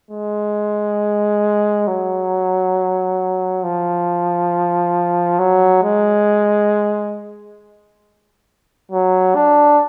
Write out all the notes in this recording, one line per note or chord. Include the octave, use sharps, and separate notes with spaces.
G#3
F#3
F3
F#3
G#3
F#3
D4